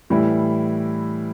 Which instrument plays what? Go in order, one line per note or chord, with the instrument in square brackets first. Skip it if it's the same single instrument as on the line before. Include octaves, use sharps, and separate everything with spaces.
[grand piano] A2 E3 G3 E4